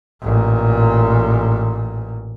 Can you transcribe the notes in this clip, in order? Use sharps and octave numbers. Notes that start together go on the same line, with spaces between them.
A1 A#2